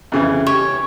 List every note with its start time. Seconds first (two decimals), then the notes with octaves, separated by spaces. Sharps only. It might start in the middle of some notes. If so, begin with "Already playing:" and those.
0.12 F2 C#3 E3
0.47 G4 C#5